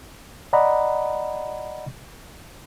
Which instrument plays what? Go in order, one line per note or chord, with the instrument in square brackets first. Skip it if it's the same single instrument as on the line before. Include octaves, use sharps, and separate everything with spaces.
[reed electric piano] D5 D#5 F#5 A#5 B5